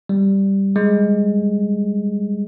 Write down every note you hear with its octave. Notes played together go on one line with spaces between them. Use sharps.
G3
G#3